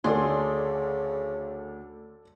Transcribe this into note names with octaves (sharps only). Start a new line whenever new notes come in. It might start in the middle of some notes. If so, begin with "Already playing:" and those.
D2 C#3 G#4 A4 D5 C6